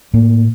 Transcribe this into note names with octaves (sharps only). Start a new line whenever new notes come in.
A2 A#3